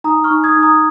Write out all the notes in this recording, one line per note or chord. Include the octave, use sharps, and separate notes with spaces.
D#4 A#5 D#6
C#6 F6
D#4
D#6 G#6
D#4
A#5 D#6